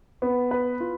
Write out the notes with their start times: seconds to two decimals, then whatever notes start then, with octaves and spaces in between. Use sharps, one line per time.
0.22 B3
0.51 B4
0.80 F4